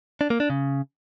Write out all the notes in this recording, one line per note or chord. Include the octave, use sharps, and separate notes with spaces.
D4
A#3
D4
C#3